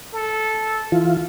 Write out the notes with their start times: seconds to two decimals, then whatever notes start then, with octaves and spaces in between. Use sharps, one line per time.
0.13 A4
0.92 E3 F4